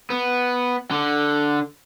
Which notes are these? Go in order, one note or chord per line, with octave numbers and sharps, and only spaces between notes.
B3
D3